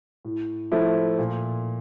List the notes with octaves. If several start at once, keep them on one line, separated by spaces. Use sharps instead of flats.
A2
F3 A3 E4
A#2